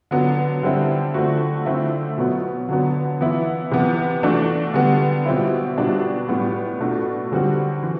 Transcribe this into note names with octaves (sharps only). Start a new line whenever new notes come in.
D3 F#3 B3
D3 G3 C4 E4
D3 A3 C4 F#4
D3 A3 C4 E4
B2 F#3 B3
D3 F#3 B3
E3 B3 E4
C3 E3 B3
E3 A3 D4 F#4
D3 G3 B3
B2 G3 C4 E4
B2 G3 D4 F#4
A2 G3 B3
B2 A3 D4 F#4
D3 G3 C4 F#4
E3